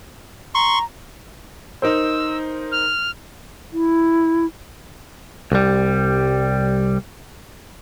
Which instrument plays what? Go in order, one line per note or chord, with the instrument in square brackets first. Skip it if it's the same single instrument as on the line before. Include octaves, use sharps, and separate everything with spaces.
[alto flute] A#5 [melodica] C6 C#6
[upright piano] D#4 A#4 C5 [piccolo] E6
[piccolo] F6
[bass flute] E4
[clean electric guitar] C2 G3